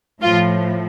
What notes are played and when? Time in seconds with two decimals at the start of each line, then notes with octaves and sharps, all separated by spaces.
0.22 A2 F3 F4